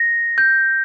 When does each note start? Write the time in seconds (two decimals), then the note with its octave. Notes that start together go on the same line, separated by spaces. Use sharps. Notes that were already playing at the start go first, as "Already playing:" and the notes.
Already playing: A#6
0.38 G6